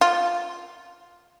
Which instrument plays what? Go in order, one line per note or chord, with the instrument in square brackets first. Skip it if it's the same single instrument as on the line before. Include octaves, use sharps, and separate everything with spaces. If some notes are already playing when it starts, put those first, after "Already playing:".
[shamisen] F4